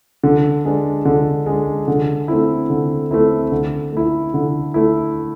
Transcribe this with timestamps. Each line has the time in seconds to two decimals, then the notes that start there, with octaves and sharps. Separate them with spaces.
0.24 D3
0.65 G#3 D4
1.05 D3
1.46 G#3 D4
1.88 D3
2.28 A3 C4 E4
2.70 D3
3.11 A3 C4 E4
3.52 D3
3.93 A3 E4
4.34 D3
4.74 A3 E4